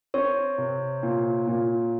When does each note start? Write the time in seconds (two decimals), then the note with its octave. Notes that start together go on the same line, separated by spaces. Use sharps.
0.14 C4 C#5
0.58 C3
1.03 A#2
1.47 A#2